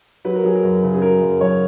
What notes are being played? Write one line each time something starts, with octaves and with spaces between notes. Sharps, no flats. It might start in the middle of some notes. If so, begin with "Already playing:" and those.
F#3 B4
A#4
F#3 G#4
A#4
F#2
C#3
G#4
F#3 A#4
F#2
F#2 C#5